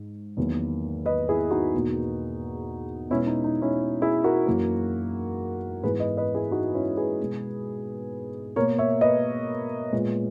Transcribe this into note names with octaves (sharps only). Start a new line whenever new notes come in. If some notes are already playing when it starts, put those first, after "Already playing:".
Already playing: G#2
E2 D#3 F#3 A#3
B4 D#5
E4 G#4
D#4 F#4
E2 B2 A#3
B2 G#3 B3 C#4 E4
D#4
D#4
C#4 E4
E4 G#4
F#4 A#4
F#2 E3 A#3
G#2 E3 B3 G#4 B4
B4 D#5
B4 D#5
E4 G#4
D#4 F#4
C#4 E4
G#4 B4
B2 G#3 B3
B2 A#3 A#4 C#5
C#5 E5
B4 D#5
A#2 G#3 B3